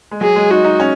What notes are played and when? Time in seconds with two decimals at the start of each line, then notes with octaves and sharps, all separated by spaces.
0.11 G#3
0.21 F#3 G#4
0.36 G#3
0.51 D#4 F#4
0.65 D#4
0.80 C#4